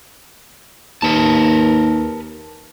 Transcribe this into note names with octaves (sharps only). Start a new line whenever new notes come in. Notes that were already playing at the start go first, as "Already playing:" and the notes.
D#2 A#4 B4 A5